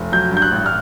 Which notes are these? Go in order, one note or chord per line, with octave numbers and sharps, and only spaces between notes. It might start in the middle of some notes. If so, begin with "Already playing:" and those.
Already playing: F1
F#3 G6
G2 G6
F#6
A1
F6